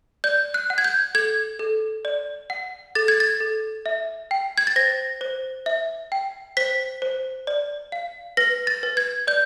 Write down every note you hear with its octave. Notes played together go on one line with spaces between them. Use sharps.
D5 G6
F#6
F#5
G#6
G6
A4 G#6
A4
D5
F#5
A4 A6
G#6
A6
A4
E5
G5
G#6
A6
C5 A#6
C5
E5
G5
C5 B6
C5
D5
F5
B4 A#6
A6
B4
G#6
D5 G6